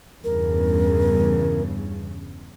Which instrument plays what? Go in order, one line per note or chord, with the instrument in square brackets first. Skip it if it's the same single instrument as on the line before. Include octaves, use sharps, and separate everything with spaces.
[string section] E2 G2 C#3 [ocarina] A#4